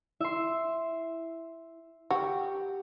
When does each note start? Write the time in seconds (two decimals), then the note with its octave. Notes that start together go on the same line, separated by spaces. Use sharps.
0.21 E4 E5 C6
2.10 F#4 G4